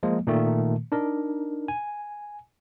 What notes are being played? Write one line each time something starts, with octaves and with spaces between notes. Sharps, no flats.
F3 G#3 A#3
A#2 D#3 A3
D4 D#4 A#4
G#5